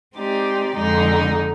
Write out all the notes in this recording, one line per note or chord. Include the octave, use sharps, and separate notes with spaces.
G#3 C4 D#4 G4 D5
F2 D3 G#3 D#4